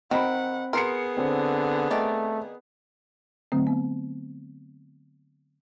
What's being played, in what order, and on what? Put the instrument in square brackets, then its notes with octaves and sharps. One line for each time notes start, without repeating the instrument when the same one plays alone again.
[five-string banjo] D#3 [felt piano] C4 B5 [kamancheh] F#5
[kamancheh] B3 G#4 [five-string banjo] A#4 [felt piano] C6 C7 C#7
[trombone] D3 [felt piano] C4
[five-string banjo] D#3 D5 [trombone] A3
[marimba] D3 F#3 A3 C4
B3